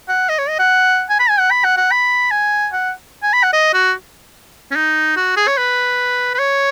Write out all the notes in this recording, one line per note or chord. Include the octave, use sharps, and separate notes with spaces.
F#5
D#5
C#5
D#5
F#5
G#5
B5
G#5
F#5
B5
F#5
F#5
B5
G#5
F#5
G#5
B5
F#5
D#5
F#4
C#4
D#4
F#4
G#4
C#5
B4
B4
C#5